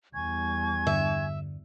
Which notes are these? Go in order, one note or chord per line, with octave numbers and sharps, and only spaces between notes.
E2 G3 G#5 C#6 G#6
G2 D3 E5